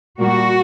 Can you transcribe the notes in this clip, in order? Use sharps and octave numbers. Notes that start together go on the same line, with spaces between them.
A#2 G3 A#3 F#4